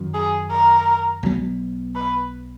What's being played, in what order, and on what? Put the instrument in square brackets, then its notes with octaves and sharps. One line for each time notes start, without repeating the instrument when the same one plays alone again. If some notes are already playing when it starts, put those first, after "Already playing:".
Already playing: [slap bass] F#2 D#3 F#3
[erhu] G#4
A#4
[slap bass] B1 B2 F#3 B3
[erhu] B4